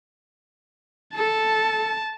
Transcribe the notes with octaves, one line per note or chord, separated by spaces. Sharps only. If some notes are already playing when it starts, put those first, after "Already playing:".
A4 A5